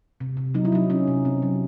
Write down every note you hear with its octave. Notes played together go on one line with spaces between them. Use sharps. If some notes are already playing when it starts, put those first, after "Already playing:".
C3
C3
F#3 D#4
E4
F#3 D#4
F#3 C#4
C3
C3 C4
F#3